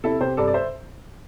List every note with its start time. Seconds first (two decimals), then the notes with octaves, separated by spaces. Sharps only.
0.04 C3 E4 A4
0.21 C3 G4 C5
0.37 G2 A4 D5
0.48 D5
0.54 C5 E5